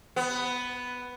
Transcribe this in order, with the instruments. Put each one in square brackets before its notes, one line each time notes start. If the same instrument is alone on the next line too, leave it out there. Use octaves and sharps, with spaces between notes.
[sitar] B3